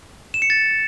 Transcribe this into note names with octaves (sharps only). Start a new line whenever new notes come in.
E7
C#7
A6